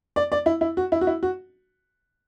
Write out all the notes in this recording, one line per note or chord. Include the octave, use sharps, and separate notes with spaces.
D5
D5
E4
E4
F#4
E4
F#4
E4
F#4